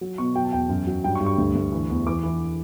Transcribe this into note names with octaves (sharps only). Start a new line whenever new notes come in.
F#3
B2 C#6
F#3 G5
A5
E2 G5
F#2
F#3
G2 G5
C#6
G2
C#6
D2
D2
E3
E2
E3 D6
E3